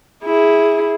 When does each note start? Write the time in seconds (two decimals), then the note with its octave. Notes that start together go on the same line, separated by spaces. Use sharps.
0.23 E4 G#4